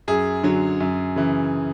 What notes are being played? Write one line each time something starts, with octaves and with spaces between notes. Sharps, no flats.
F#2 G#4
D3 F#3
F#2
C#3 E3